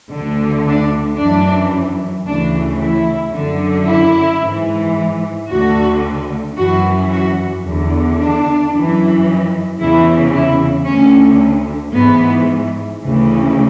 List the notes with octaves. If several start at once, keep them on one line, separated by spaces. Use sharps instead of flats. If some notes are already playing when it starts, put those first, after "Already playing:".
D2 D3
D4
F#2 E3 D4
D2 C#3 E3 D4
E4
F#2 D3
E4
G#2 E3
D2 D3 F#4
F#2 E3 F#4
F#4
E2 D3
D4
F#2 E3
E2 C#3 E3 E4
E4
D2 D3 C#4
G#2 E3 B3
D2 C#3 E3